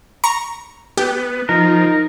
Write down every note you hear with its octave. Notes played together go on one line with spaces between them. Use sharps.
A#5 C#6
B3 G4
F3 D#4 A#4